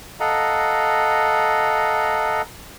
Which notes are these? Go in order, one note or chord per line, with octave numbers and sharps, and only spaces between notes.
A4 D#5 F5 F#5 A#5